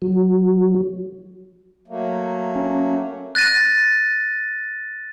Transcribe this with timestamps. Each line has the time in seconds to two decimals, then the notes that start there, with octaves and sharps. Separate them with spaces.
0.02 F#3
1.88 F#3 A3 A#3
2.56 C#4
3.35 F#6 A6 A#6 D#7